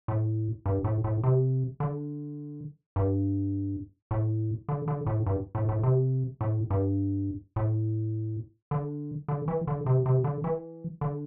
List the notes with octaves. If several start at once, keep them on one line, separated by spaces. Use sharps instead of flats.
A2
G2
A2
A2
C3
D3
G2
A2
D3
D3
A2
G2
A2
A2
C3
A2
G2
A2
D3
D3
E3
D3
C3
C3
D3
E3
D3